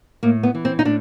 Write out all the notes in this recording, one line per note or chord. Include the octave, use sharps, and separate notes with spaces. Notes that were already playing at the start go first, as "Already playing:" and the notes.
A2 A#3
B3
E3
C4
D#4
A2 D4